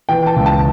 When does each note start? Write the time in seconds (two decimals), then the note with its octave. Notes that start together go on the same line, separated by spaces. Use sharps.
0.09 E3 G5
0.27 A5
0.36 C#2
0.46 A5